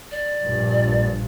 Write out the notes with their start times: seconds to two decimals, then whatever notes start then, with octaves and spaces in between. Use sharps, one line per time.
0.11 D5
0.43 A#1 G2